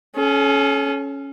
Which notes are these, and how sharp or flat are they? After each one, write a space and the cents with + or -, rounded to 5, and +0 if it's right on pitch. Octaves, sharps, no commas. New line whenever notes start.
C#4 +0 A4 -45